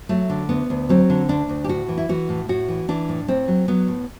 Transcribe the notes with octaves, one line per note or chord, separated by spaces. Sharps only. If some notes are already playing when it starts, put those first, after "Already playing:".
F#3 A3
D3
D2 B3
D2
F#3 C4
D3
D2 D4
D2
G4
A2 F#4
E3
E4
E3 F#4
A2
A2 F#4
E3
E3 D4
A2
A2 C4
F#3
F#3 B3
A2